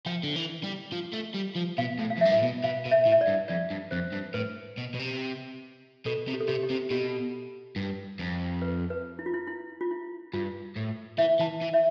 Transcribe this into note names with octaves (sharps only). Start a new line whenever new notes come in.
F3 G5
D3
E3
G3
F3
A3
G3
F3
B2 F5
A2
F5
F2
G2 E5
A2
B2
B2 F5
B2
E5
A2
E5
D5
G2
F2 D5
G2
F2 C5
G2
A2 B4
B2
B2
C3
B2 A4
C3
G4
A4
C3 G4
G4
C3
B2 G4
G2
F2
B4
B4
E4
F4
E4
E4
F4
E4
G2 F4
A2
E3 E5
E3 A5
E3
E5